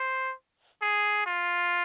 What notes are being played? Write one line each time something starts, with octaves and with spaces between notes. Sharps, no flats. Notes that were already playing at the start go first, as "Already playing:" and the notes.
Already playing: C5
G#4
F4